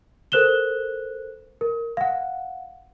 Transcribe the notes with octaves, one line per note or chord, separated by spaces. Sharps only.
A4 A#4 C5 F#6 E7 G7
A#4
F5 F#5